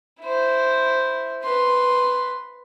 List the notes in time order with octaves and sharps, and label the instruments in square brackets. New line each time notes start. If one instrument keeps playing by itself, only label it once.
[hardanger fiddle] E4 C5
B4 C6